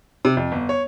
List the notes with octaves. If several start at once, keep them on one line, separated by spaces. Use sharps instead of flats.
C3
F2
G1
C#5